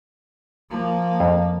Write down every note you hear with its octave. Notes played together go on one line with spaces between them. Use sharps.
F3 A#3
F2